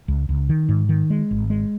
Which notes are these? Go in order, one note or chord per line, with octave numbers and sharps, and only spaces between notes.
C#2
C#2
D#3
G#2
D#3
G#3
G#1
G#3